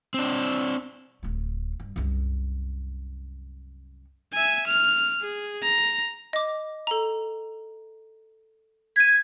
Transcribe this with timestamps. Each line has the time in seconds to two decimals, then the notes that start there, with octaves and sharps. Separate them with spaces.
0.14 C4 D4
1.23 D1 A3
1.80 G2
1.96 C2 F#2
4.33 E5 G#5
4.67 F6
5.21 G#4
5.63 A#5
6.33 D#5 D6
6.87 A4 A#5
8.96 G#6 B6 D#7